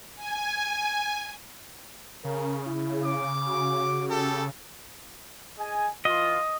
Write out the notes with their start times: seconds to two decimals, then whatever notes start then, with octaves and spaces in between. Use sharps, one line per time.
0.16 G#5
2.25 C#3 A#4
2.67 E4
3.04 D6
3.48 F#4
4.08 G4 A4
5.59 G#4 D#5 G#5
6.05 E3 F4 D#5